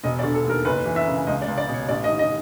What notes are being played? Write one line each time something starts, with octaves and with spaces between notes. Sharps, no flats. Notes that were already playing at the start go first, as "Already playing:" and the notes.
E1 D#5
D5
D3
A4
D#2 A#4
F#1 B4
E3
E5
C#3
C#2 D#5
D5
C#2
D5
B2
C#5
A1 D5
D#5
D#3
D#5